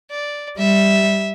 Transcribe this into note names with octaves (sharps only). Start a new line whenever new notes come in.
D5
G3 E5